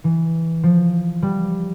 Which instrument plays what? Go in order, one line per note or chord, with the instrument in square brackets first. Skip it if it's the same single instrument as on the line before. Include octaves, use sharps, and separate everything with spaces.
[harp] E3
F3
G3